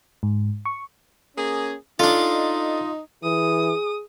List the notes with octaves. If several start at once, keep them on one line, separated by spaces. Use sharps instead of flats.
G#2
C#6
A#3 C#4 G#4
D4 D#4 F4 A4 D#5
E3 G#4 D#6